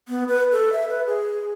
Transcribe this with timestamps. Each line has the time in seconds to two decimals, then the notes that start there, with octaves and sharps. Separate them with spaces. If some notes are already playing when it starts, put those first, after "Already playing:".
0.08 B3
0.28 B4
0.52 A4
0.73 E5
0.89 B4
1.07 G#4